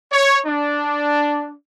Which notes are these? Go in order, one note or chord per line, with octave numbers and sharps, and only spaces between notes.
C#5
D4